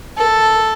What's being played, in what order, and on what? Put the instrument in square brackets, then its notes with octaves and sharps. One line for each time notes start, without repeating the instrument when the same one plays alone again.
[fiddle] A4